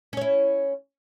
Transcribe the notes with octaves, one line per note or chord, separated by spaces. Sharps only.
C#4 E4 C#5